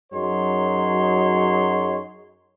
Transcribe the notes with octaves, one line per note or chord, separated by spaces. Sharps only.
F#2 F#3 D#4 G#4 C#5 C6